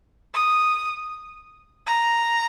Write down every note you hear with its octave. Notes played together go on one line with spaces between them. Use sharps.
D#6
A#5